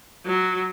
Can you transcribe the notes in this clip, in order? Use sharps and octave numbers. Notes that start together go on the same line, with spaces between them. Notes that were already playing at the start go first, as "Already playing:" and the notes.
F#3